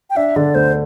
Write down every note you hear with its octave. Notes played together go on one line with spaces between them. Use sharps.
G5
D4 E5
D3 D5
D2 C5